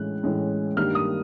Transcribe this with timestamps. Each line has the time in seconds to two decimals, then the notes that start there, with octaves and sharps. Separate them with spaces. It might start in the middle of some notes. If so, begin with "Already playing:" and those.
Already playing: A2 E3 G#3 C#4 F#6
0.23 A2 E3 G#3 C#4
0.77 G2 D#3 G3 A#3 F6
0.95 D#6